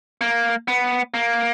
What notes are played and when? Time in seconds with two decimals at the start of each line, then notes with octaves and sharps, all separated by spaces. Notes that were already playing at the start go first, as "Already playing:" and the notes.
0.21 A#3
0.68 B3
1.14 A#3